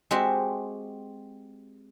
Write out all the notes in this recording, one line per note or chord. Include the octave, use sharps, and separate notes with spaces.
G#3 C4 F#4 G4 E5